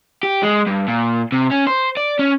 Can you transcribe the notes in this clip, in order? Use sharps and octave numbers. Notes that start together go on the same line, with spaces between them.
G4
G#3
G2
A#2
C3
C#4
C5
D5
C#4